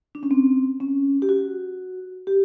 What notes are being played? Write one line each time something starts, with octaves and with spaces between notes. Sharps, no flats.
D4
C#4
C4
C#4
G4
F#4
G4